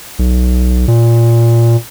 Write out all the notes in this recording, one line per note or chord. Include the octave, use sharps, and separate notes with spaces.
B1
A#2